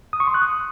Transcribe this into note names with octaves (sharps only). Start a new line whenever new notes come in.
D#6
C#6
C6
F#6
D#6